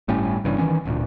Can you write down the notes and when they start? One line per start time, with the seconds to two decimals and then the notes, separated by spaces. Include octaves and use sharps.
0.08 G1 A2 G3 C#4
0.44 G1 G2 C#3 E3
0.58 D#3 E3 B3 C#4
0.85 D1 D2 A#2